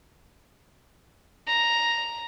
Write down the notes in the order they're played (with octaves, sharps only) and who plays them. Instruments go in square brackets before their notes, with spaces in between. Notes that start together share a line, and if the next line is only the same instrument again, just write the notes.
[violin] A#5